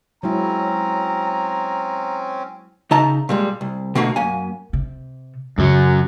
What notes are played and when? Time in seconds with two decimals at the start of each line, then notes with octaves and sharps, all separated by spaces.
0.23 F#3 G#3 C4 C#4 E4 A#5
2.91 C#3 D#4 D#5 E5 A5 A#5
3.29 A#2 G3 G#3
3.61 C2
3.95 B2 D3 A3 A#3 F#4
4.16 F#2 A#3 G#5
4.73 C3
5.58 F#2 C#3 E3 F#3